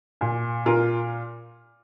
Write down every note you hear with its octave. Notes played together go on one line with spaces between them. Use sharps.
A#2
A#2 F4 A#4